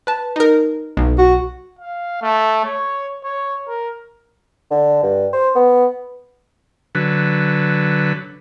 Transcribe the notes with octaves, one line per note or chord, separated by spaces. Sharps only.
B4 A5
D#4 A#4
B1
F#4
F5
A3
C#5
C#5
A#4
D3
G2
C5
B3
D3 F#3 B4